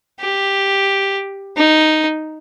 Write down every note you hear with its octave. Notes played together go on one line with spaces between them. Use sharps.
G4
D#4